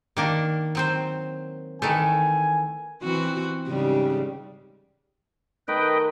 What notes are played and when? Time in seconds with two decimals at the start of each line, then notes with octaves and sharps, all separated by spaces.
0.17 D#3 A#3 D4
0.75 F#3 C4 C5
1.82 D#3 E3 A3 G#5
3.02 E3 C4 F#4
3.67 G#2 C#3 G3
5.68 D#3 A3 B4 D#5 G5